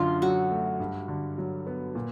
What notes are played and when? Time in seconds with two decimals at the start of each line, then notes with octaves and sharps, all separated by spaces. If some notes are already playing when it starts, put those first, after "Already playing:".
Already playing: F#2 D3 D4 F4
0.22 F#3 F#4
0.51 A3
0.80 G2
1.08 D3
1.38 F#3
1.67 B3
1.95 A#2